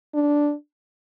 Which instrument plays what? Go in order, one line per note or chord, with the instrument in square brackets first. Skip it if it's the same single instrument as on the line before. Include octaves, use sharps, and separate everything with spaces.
[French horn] D4